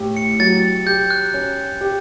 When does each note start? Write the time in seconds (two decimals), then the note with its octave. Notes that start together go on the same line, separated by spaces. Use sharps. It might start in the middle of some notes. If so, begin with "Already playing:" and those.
Already playing: A2 G4
0.17 C#7
0.40 F#3 A6
0.86 G4 G6
1.10 F#6
1.34 C#4
1.81 G4